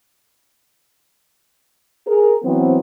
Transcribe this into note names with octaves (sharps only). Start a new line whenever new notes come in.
G#4 A#4
E3 F#3 B3 C4